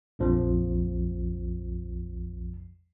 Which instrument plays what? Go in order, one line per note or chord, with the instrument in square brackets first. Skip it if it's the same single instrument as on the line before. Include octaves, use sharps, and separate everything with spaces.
[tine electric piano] A#1 F2 F3